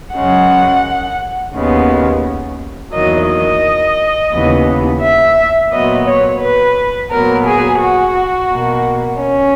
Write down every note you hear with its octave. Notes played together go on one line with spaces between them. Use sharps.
F#2 C#3 G#3 F#5
D#2 C#3 G#3 B3
E2 D#3 F#3 A#3 D#5
D#5
D#2 C#3 E3 B3
E5
A#2 F#3 B3 D#5
C#5
B4
A#2 F#3 B3 A#4
G#4
F#4
B2 A#3
C#4